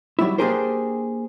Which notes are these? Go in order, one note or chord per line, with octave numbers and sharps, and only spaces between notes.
F#3 G3 E4
A#3 D4 G4 G#4 A#4 C5